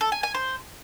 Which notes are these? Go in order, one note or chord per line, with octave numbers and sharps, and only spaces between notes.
A4
G#5
G#5
C5